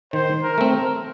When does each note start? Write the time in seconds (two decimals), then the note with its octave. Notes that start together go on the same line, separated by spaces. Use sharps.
0.13 D#3 C5
0.43 A#4
0.58 A3 C4
0.73 A#4